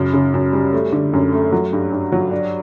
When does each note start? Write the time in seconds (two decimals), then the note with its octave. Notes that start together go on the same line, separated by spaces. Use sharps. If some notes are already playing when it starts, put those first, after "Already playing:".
Already playing: F#2 C#3
0.13 C#3
0.34 F#2
0.53 G3
0.73 A3
0.92 D3
1.13 F#2
1.33 A3
1.52 F#3
1.73 G2
1.92 G2
2.12 F#3
2.31 D4